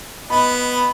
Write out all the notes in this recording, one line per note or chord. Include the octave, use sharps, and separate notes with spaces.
B3 D#5 B5